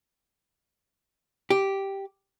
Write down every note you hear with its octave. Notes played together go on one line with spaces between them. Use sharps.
G4